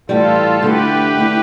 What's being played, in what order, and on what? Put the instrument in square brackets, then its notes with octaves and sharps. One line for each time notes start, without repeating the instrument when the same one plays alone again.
[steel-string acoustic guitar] A2 E3 G3 [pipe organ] F4 A4
[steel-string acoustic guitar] D3 A3 E4 [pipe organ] G4 B4
[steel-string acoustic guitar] D3 A3 E4